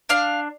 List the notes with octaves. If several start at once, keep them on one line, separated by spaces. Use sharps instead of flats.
D4 F5